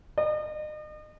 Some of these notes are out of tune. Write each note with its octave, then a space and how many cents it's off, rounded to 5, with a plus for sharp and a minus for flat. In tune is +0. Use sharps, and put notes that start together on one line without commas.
D#5 -40